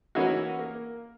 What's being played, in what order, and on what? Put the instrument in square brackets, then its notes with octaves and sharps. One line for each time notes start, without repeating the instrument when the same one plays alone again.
[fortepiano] E3 A#3 C#4 D#4 E4 F#4
A#3